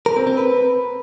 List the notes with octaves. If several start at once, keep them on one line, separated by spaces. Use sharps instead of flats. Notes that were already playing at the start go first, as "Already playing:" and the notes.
A#4
C4
C4
B4